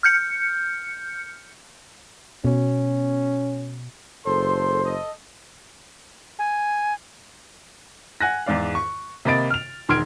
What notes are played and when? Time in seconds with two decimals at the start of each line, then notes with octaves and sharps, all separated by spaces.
0.03 F6 G6 C#7
2.45 B2 C#4
4.26 F#1 A4 C5 C6
4.84 A4 D#5
6.39 G#5
8.21 F#5 G#5 F#6 A#6
8.46 E2 G#2 D5 F5
8.75 C#6
9.25 C3 A#3 D#5 B5 A6 D7
9.50 F6 F7
9.89 E1 D#3 C6 F6 G#6 D7